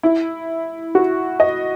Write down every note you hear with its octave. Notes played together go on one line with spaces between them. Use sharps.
E4
F#4
D#5